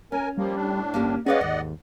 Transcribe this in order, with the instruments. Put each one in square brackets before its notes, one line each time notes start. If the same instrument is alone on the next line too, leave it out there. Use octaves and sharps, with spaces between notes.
[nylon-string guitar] C#4 [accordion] A#4 G#5
[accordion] F3 A#3 [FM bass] G3
[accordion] A2 D4
[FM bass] G1 [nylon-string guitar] A#3 C#4 G4
[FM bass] C#4 [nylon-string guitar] G#4 B4 F5 [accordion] D5 D#5 F#5
[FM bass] D#2 [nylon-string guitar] G#2